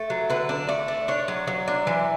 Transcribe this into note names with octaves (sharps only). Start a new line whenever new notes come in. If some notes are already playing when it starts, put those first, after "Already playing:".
Already playing: A3
F#3
D3 B4
D4
A3 D5
D4
D4 C#5
F#3
F#3
D4
E3